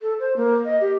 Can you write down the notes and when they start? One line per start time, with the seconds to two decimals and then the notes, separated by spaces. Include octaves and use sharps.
0.01 A4
0.20 C5
0.36 A#3
0.65 D#5
0.81 G4